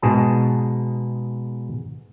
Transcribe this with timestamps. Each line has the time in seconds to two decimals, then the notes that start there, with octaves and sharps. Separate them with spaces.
0.02 G#2 B2 G#4 A5